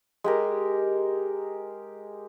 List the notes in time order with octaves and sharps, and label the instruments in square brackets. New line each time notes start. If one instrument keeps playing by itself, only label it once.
[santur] G#3 G4 A#4